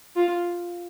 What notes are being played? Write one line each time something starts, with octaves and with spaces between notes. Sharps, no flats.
F4